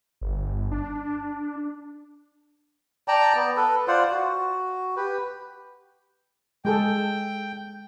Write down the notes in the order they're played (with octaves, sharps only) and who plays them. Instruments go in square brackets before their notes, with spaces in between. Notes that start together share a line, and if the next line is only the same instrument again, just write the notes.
[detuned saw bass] G1
D4
[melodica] D5 G5 A5 A#5
B3
A4 B4
F4 C5 D5 F#5
F#4
G4 B4
[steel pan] G#3 G#4 A4 [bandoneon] G5